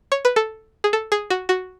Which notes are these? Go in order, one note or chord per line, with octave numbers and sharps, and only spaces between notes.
C#5
B4
A4
G#4
A4
G#4
F#4
F#4